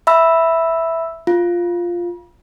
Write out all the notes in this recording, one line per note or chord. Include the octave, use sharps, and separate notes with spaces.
E5 B5 E6
F4